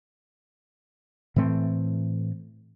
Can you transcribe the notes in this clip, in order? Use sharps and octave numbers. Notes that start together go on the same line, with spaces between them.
A2 E3 A3 C4